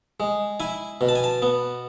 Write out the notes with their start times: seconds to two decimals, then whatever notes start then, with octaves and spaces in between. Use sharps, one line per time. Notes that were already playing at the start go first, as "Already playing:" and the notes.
0.20 G#3
0.60 E4 G#5
1.01 B2
1.09 A5
1.15 G#5
1.24 A5
1.42 B3